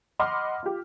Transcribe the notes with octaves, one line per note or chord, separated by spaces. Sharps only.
D#5 F#5 B5 C6 D6 F6
F4 G4